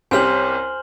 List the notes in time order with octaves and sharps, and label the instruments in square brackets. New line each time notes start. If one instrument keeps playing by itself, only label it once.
[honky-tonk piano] C2 C#4 G4 [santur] C5 [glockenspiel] G#5 F6 F#7